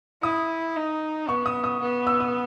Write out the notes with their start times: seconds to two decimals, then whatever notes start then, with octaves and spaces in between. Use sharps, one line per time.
0.22 E4 D#6
0.76 D#4
1.28 B3 C#6
1.46 D#6
1.64 D#6
1.81 B3
2.07 E6
2.20 D#6